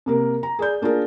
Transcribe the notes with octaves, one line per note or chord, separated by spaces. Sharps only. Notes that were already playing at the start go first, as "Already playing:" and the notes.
C3 A#3 A#4
A#5
G#4 D5 G6
A#3 D4 F4 G#4 A#4